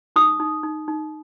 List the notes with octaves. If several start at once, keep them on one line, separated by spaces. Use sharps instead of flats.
D#4 D#6
D#4
D#4
D#4